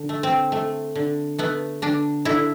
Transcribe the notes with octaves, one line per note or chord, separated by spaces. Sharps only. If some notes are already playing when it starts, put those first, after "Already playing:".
Already playing: D3
A3
C4
A3
D3
A3 B3
D3 D4
D3 E4